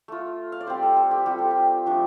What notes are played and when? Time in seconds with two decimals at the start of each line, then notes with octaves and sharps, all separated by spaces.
0.08 A3 F4
0.52 F5
0.61 D5
0.67 G3 C4 F4 C5
0.83 A4
0.97 A4
1.11 G4
1.26 G3 C4 F4 G4
1.39 A4
1.51 G4
1.86 F3 A3 D4